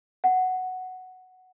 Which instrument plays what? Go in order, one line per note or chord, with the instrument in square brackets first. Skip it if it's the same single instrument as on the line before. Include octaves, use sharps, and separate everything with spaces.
[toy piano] F#5